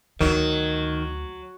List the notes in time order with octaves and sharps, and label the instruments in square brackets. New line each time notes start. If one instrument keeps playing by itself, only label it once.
[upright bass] D2 [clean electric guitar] D#3 [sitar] F#3